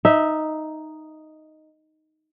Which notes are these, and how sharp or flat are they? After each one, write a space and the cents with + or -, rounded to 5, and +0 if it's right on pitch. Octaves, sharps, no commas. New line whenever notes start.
D#4 +0 E5 -15